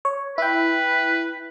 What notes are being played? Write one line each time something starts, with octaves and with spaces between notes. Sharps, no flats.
C#5
E4 B4 G5